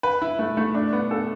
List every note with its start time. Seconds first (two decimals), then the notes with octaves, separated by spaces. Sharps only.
0.03 B4
0.22 E4
0.39 A3
0.57 A3
0.75 D4
0.93 B3
1.11 A4